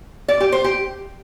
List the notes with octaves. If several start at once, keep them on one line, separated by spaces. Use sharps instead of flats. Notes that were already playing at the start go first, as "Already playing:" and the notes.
D5
G4
C5
G4